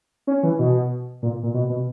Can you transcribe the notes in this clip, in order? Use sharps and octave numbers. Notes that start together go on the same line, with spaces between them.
C#4
E3
B2
A#2
A#2
B2
B2